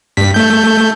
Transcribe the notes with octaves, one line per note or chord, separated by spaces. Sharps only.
G2 B6
A3 G6